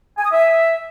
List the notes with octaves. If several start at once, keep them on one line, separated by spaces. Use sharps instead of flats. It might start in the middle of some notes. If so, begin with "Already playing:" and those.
G#5
D#6
E5